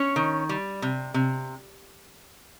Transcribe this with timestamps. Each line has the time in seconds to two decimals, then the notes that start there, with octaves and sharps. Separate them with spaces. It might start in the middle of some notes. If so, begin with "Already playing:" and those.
Already playing: C#4 C#5
0.16 D#3
0.49 G3
0.82 C3
1.14 C3